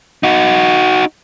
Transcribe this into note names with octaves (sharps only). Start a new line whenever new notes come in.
D#4 F#4